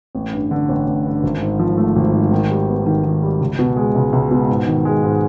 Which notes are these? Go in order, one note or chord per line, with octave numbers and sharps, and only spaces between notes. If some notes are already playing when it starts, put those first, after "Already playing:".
A1
G2
D3
A1
A1
G2
G#1
G#2
F3
A3
G#1
G#2
D#3
G3
B3
D#3
D#3
G3
C#2
B2
G#3
C#2
C#2
B2
G#2
D#3
G#3
G#2